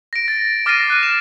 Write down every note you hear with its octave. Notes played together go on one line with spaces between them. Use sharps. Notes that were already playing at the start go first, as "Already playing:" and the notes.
A#6 D7
A6
D6 F6 A6 A#6 C7 D#7
F#6 D#7
E7